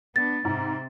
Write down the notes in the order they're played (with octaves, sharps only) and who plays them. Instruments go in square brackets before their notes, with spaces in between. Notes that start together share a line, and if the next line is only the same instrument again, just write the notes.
[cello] B3 D4 [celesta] A6
[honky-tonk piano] G#2 [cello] C3 C4